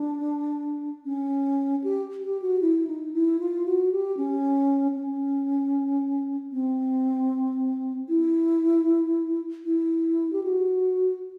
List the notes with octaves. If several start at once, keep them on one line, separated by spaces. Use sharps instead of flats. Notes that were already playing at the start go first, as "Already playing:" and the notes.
Already playing: D4
C#4
G4
G4
F#4
E4
D#4
E4
F4
F#4
G4
C#4
C#4
C4
E4
E4
G4
F#4